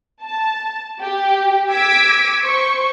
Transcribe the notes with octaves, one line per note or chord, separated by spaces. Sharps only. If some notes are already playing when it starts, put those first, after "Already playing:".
A5
G4
D6 E6 G#6 B6 D7
C5 C#6